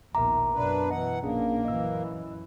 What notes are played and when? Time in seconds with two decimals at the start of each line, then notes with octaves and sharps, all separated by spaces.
0.15 A#1 D#2 B2 A#4 E5 A#5 D6
0.54 F#2 B2 D4 B4
0.91 E3 D#5 F#5
1.23 A#1 A#3 C#4 D4 G#4
1.65 F#2 E3 D#5 E6